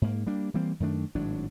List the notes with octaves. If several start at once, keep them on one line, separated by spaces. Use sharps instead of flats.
G#2 A#3
G3 A#3 D4
E3 G3 A#3 C4
F#2 D#3 A3 D4
G#1 A2 F#3 D4